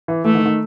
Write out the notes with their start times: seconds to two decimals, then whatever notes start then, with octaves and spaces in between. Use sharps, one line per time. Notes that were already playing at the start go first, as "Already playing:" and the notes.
0.08 E3
0.25 E3 A3
0.35 D#3
0.45 D#3